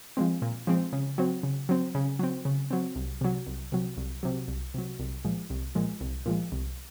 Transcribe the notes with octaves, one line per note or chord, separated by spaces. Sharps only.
F3 G#3 C4
A#2
F3 G#3 C4
C#3
F#3 C4
C#3
F#3 C4
C#3
F#3 C4
C#3
F#3 C4
C2
C3 F#3
C2
C3 F#3
C2
C3 F#3
C2
C3 F#3
C2
A#2 F3 G#3
C2
A#2 F3 G#3
C2
A#2 F3 G#3
C2